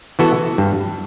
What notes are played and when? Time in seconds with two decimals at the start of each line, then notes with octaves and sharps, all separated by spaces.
0.19 E3 B3 F#4 A4
0.58 G2